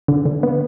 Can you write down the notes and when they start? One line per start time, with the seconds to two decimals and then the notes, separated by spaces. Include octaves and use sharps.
0.08 D3
0.26 D3
0.43 B3